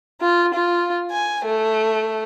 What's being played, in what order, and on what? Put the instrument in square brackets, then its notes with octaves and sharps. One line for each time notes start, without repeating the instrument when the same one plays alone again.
[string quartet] F4
F4
G#5
A3